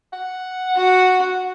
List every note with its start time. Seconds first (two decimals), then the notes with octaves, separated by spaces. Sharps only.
0.13 F#5
0.76 F#4